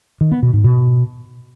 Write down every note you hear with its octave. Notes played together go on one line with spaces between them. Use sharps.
D#3
B3
B2
G#2
B2